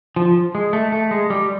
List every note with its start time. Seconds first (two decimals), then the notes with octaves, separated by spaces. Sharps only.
0.16 F3
0.55 G#3
0.73 A3
0.92 A3
1.11 G#3
1.30 G3